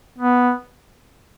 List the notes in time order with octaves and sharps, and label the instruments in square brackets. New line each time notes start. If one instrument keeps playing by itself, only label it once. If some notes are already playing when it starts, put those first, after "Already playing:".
[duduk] B3